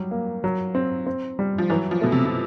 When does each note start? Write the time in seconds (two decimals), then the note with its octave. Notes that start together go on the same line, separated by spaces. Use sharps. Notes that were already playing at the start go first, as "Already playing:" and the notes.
Already playing: F#3 G3
0.11 A#3
0.44 F#3
0.75 C4
1.07 C4
1.39 G3
1.58 F3
1.70 E3 F#3
1.91 F3
2.01 B2 A3
2.12 C3
2.25 C3